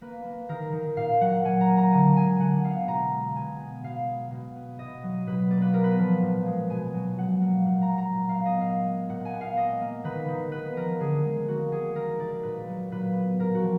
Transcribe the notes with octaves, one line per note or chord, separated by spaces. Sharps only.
A#3 B4
A#3
D#3 A#4
D#3
A#2 F5
F#3 F#5
A#2 G#5
A#5
A#3
A#5
D3 G#5
G#3 G#5
D3 F#5
B3 F5
B2 A#5
G#3
B2 G#5
B3
B2 F5
G#3
B2
B3
B2 D#5
F#3
B2 B4
A#3 D5
B4
B3 A#4
B4
F3
A#2
G#3
B2 G#5
F#3
B2 F#5
A#3
A#2 F#5
A#5
F#3
A#5
A#2
F5
B3
D#5
A#2 F5
G#3
A#2 F#5
G#5
B3
F5
A#3 D#5
A#3
D#3 B4
D#3
B3 B4
F3 A#4
D3 G#4
G#3
A#3 F#4
A#3 G#4
D#3 A#4
D#3 D5
A#2 B4
F#3
A#2 B4
B3
A#2 A#4
F#4
F3